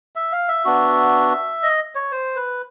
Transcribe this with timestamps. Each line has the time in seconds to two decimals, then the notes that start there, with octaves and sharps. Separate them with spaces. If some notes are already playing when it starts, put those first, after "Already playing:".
0.16 E5
0.32 F5
0.48 E5
0.65 B3 D4 F#4
1.63 D#5
1.95 C#5
2.12 C5
2.36 B4